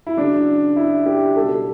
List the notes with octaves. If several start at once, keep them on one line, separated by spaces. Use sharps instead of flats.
E4
C#3 F#3 D4
E4
G4
B2 G3 A4